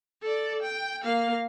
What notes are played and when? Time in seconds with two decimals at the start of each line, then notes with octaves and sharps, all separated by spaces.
0.22 A4 D5
0.62 G5
1.04 A#3 F5